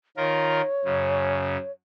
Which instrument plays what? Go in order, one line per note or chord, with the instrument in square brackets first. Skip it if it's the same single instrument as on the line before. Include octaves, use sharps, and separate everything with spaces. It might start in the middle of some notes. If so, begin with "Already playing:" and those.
[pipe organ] D#3 F4 A#4 [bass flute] C#5
[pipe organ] F#2 C#3